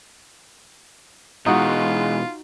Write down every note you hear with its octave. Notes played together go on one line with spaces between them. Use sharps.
B2 E3 G#3 D#4 F4 F#4